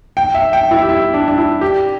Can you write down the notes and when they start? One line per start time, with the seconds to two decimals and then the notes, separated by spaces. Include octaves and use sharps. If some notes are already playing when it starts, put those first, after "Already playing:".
0.17 G5
0.34 E5
0.53 G5
0.71 E4
0.83 G4
0.89 E4
1.14 D4
1.28 D4
1.38 E4
1.61 G4